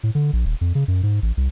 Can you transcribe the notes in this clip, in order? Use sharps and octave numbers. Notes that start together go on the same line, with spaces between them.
A2
D3
A#1
D#1
F2
C#3
F#2
G#2
A1
C2